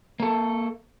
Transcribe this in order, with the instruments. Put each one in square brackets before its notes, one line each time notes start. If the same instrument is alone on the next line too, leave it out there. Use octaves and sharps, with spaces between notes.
[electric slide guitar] A#3 A4